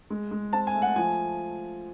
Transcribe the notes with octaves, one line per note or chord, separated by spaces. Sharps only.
G#3
G#3
C4 A5
G#5
A3
F#5
F3 G#5